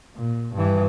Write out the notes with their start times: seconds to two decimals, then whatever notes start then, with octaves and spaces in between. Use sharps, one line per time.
0.16 A#2
0.55 G2 E3